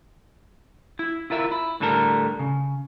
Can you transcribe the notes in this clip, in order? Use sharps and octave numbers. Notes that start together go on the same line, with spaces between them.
E4
E4 F4 A#4 E5
E4
A2 D3 G3 A4 A#4
C#3